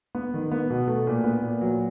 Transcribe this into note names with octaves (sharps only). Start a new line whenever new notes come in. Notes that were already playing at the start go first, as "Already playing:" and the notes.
B3
D#3
B3
B2
A3
A#2
B3
A#2
F#3